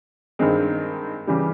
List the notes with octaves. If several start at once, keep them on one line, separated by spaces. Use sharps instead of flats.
G2 D#3 G#3 C4
C#3 E3 G3